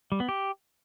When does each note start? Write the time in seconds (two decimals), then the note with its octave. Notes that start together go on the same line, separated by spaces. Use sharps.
0.12 G3
0.20 B3
0.29 G4